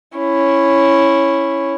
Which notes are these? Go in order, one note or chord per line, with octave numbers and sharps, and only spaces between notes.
C#4 E4